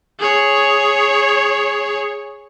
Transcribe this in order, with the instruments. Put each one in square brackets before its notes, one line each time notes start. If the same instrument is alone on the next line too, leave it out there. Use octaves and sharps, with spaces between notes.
[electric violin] G#4 C#5